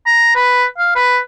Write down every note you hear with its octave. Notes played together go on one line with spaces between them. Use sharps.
A#5
B4
F5
B4